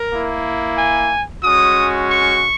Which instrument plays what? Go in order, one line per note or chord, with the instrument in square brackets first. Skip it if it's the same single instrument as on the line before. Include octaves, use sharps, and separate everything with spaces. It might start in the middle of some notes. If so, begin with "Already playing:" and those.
Already playing: [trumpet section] A#4
A#3 E4
G#5
G#3 C#4 F#4 D#6
C#6